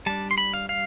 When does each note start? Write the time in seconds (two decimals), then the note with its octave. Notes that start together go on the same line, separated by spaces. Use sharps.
0.06 G3 D4 A5
0.31 C6
0.38 B5
0.54 F5
0.69 F5